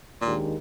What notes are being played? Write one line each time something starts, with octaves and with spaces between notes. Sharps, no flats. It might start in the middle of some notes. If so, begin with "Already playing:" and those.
D#2 A#2 D#3 G#3 D4 G4